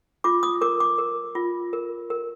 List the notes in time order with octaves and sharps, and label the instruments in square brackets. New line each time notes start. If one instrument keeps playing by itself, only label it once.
[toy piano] F4 D6
D#6
A#4 D6
D6
A#4
F4
A#4
A#4